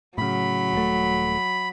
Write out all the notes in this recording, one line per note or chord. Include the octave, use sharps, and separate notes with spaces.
A2 C#3 F#3 B5
D#1 A3